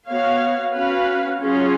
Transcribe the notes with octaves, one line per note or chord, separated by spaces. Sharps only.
B3 F#4 C#5 F5
C#4 F#4 B4 F5
F#3 C#4 F4 G#4